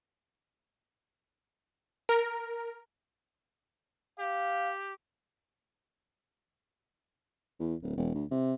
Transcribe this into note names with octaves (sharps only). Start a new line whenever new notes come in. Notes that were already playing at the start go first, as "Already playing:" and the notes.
A#4
G4 F5
E2
D1
E1
D2
C3